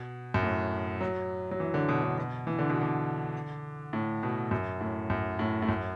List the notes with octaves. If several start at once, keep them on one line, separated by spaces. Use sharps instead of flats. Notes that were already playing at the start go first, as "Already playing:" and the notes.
Already playing: B2
F#2
A2
F#3
F#3
E3
D3
B2
D3
B2
E3
D3
B2
D3
A2
B2
F#2
A2
F#2
A2
A2
F#2